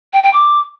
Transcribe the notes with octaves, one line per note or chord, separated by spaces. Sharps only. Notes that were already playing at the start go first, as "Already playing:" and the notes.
G5
G5
D6